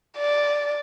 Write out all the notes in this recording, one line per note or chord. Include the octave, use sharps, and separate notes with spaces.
D5